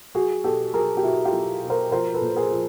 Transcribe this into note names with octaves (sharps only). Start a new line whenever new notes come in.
F#3 F#4 G#4
B2 G4 A4
F#3 G#4 A#4
G4
B2 E4 F#4
F4 G4
F#3
B2
A#4 C5
F3 A#4 C5
A4 B4
A#2
G#4 A#4
F3